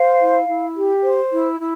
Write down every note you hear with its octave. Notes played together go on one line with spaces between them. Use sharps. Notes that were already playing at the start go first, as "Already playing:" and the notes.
Already playing: C5 F5
E4
E4
G4
C5
E4
E4